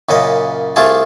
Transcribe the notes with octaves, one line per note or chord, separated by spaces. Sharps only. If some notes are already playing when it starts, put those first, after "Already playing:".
F#2 A#2 C#3 D#5
C2 A3 F4 G#4 A5